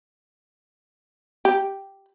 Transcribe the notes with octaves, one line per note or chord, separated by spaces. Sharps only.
G4